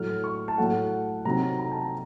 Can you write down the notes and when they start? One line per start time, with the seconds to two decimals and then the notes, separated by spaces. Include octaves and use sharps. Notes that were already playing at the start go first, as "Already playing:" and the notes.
Already playing: A2 F#3 A3 F6
0.24 C#6
0.48 A5
0.58 A2 F#3 A3 F#5
1.25 C3 F#3 C4 D#4 A#5
1.59 A#5
1.71 A5
1.82 A#5